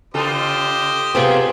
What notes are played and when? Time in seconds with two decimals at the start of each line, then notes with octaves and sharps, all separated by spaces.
0.14 C#3 F4 G4 A4 C5 D#5
1.15 C3 A3 B3 C4 F4 G#4 G5